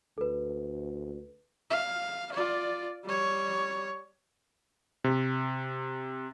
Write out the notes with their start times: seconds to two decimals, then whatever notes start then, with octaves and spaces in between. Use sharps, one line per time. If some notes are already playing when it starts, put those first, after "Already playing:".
0.18 D2 A4 B4
1.70 F5
2.32 F4 D5
3.04 G3 C#5
5.04 C3